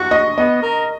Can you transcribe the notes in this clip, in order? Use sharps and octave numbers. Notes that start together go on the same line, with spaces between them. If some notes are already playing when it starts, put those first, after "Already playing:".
Already playing: F#4 C#6
D#5
B3 D#5
A#4